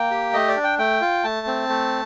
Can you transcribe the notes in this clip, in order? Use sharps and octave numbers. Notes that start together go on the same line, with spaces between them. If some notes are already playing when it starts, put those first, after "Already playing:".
Already playing: A#3 G5
G4
A3 D#5
D5
D4
G5
A3 G5
F4
A3 A5
C4
A3